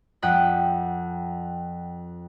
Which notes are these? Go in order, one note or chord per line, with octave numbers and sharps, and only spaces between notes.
F2 F#5 G5 D#6 B6